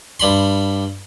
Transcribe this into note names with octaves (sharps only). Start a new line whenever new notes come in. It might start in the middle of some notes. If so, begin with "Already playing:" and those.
G2 G3 B5 C6